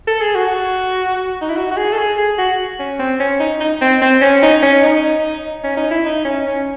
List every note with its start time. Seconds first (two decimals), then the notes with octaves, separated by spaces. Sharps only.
0.08 A4
0.21 G#4
0.35 F#4
1.42 D#4
1.49 E4
1.57 F#4
1.72 F#4
1.77 G#4
1.93 A4
1.98 G#4
2.18 G#4
2.38 F#4
2.79 C#4
2.99 C4
3.20 C#4
3.40 D#4
3.60 D#4
3.82 C4
4.02 C4
4.21 C#4
4.43 D#4
4.62 C#4
4.83 D#4
5.64 C#4
5.77 D#4
5.91 E4
6.06 D#4
6.25 C#4
6.46 C#4